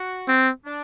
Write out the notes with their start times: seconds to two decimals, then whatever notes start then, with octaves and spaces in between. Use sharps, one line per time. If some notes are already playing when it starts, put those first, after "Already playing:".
Already playing: F#4
0.28 C4
0.65 D4